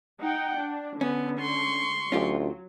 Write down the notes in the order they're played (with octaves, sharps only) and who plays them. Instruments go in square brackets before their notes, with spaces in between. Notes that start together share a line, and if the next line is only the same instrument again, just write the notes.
[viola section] D#4 F#5 G5
D4
[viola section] D3 [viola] B3 [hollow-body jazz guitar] C#4
[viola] C6 C#6
[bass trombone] D2 [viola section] F#3 [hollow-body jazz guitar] C#4 F4 G4